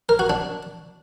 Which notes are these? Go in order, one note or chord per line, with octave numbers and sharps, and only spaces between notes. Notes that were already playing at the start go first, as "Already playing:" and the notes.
A#4
F#4
D4